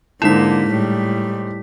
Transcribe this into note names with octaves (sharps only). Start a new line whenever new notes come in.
G#2 D3 A#3 E4 B6 E7
A2 G3